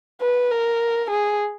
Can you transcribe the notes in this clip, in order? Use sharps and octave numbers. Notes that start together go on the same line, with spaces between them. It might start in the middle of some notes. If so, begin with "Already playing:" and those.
B4
A#4
G#4